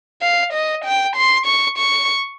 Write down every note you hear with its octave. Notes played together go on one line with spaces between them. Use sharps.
F5
D#5
G5
C6
C#6
C#6